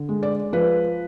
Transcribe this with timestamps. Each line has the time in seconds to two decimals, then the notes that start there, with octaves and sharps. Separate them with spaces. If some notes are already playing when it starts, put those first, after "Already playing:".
Already playing: D3
0.09 G#3
0.23 D5
0.53 F3 B4